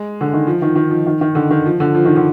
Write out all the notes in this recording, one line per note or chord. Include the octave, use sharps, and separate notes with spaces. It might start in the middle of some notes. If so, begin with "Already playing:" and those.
Already playing: G#3
D3
D#3
F3
D#3
D#3
F3
D#3
D#3
D3
D#3
F3
D3
F3
D#3
D3